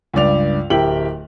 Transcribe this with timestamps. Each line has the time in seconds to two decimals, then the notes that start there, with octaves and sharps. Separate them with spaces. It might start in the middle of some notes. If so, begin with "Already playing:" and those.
0.13 C#2 G2 D5 F7
0.70 D1 E4 G4 A#4 G5 F#7